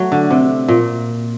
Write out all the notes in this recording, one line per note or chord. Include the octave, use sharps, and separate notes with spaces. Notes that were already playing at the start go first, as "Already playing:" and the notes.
Already playing: F#3 A3
D3
C3
A#2